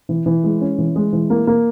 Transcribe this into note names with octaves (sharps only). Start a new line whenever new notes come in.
E3
E3
G#3
C#4
E3
G#3
E3
A#3
A#3